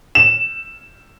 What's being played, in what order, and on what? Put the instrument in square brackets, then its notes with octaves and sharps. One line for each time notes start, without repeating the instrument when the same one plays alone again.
[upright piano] E7